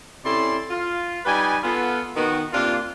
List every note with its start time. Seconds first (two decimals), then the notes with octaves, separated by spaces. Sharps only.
0.24 C3 C#4 E4 A4 D5 C6
0.69 F4
1.25 G3 D#4 B4 G#5
1.64 B3 F4 A4
2.16 D#3 B3 F#4
2.53 C3 A#3 D4 F4